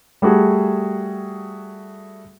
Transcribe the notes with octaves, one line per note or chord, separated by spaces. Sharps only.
G3 A3 F#4 G#4